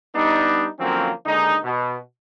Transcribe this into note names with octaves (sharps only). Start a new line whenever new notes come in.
G3 B3 D4 D#4
D3 F3 F#3 A#3 C4 C#4
D#2 D3 G#3 D#4
B2